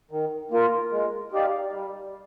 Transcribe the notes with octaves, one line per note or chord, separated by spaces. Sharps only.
D#3
A#3 F4 A#4
G#3
D#4 G4 D5 F5
G3